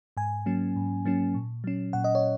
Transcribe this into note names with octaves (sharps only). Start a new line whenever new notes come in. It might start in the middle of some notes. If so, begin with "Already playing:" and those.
G#2 G#5
F#3 A#3 C#4
G#2
F#3 A#3 C#4
A#2
F#3 C#4
A#2 F#5
D#5
C#5